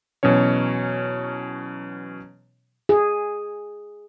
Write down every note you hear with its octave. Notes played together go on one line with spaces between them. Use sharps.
E2 B2 F#3 C#4 C#5
G#4